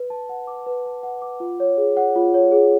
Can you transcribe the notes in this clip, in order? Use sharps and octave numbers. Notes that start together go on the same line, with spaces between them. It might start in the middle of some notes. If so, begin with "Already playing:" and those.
Already playing: B4
A5
F#5
D6
B4
A5
F#5
D6
F4
C#5
G#4
F#5
F4
C#5
G#4